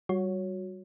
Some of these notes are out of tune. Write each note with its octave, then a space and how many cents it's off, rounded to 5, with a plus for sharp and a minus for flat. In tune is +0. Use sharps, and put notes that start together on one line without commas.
G3 -20 F#4 -20 C#5 +0